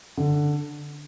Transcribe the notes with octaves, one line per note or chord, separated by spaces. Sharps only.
D3